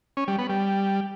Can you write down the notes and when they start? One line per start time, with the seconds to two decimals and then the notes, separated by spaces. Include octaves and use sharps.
0.17 C#4
0.28 G3
0.38 B3
0.49 G3